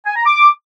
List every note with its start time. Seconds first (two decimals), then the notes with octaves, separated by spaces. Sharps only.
0.06 G#5
0.16 A#5
0.26 D6